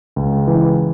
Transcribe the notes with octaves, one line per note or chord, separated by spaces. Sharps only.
C#2
E3